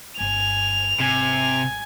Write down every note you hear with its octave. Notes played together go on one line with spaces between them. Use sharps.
G1 G2 G#5 F7
G#1 C3 G3 G#5